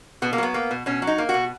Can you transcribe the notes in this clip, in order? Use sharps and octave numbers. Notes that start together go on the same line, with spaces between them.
B2 B3
A#3
F#3 B3
A#3
B2
B2 C#4
F#3
D#4
A#3
F#4
B2